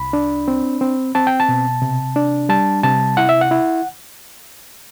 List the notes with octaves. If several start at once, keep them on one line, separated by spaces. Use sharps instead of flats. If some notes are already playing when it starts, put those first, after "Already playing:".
Already playing: C2 B5
D4
C4
C4
C4 A5
G5
A5
B2
C3
D4
G3 A5
C3 A5
E4 F#5
E5
F#5
E4